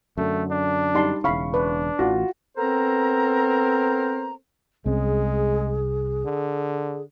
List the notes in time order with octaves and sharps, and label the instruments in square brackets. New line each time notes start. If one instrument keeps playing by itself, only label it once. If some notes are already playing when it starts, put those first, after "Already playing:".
[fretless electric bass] F#2 D3 [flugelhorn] A3
[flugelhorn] D4
[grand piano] G3 A5 [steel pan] D#4 C6
[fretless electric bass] E1 C#3 [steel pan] E4 F5 B5 [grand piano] C#6
[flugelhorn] D4 [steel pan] B4
[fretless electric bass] A1 E3 [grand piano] F4 F#4
[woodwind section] B3 C4 A4 A#4 C5 A#5
[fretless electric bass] C2 C4 C#4 [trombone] G#3 [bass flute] G#4
[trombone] D3